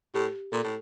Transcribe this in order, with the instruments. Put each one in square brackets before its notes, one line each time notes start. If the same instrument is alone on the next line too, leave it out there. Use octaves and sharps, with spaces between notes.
[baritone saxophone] A2 [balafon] G4
[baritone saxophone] A#2 [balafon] A4
[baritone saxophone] A2